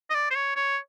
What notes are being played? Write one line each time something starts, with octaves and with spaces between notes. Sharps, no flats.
D#5
D5
C5
C#5
C#5